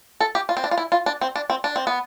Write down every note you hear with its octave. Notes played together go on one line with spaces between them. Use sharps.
A4
G4
F4
C4
D4
F4
E4
F4
D4
C4
D4
C4
D4
C4
B3